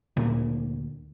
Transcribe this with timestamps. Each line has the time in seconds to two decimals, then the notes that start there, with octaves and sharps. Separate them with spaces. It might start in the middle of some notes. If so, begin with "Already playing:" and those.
0.17 D2 A#2 A#3